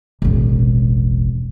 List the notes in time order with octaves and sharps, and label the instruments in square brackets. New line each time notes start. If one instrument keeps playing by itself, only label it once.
[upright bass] E1 A1